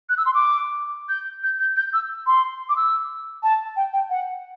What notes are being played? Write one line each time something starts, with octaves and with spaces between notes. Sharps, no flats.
F#6
E6
C6
D6
G6
G6
G6
G6
E6
C6
D6
E6
A5
G5
G5
F#5